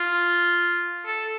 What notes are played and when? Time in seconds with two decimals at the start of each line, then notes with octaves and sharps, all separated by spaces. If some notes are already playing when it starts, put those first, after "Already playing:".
Already playing: F4
1.06 A4